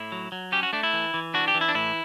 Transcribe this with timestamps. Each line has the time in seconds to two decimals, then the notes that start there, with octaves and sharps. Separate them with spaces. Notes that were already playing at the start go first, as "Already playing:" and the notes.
Already playing: A2 E4
0.12 F#3
0.32 F#3
0.52 C#4 G4
0.63 F#4
0.73 A3 D4
0.83 E4
0.93 E3
1.14 E3
1.34 D4 F#4
1.48 G4
1.55 E3
1.61 E4
1.68 D4
1.75 A2 E4